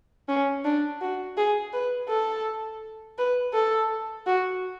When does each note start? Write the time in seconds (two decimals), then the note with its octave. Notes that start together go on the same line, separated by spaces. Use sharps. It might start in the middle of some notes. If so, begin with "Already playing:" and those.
0.29 C#4
0.65 D4
1.01 F#4
1.37 G#4
1.73 B4
2.08 A4
3.18 B4
3.53 A4
4.27 F#4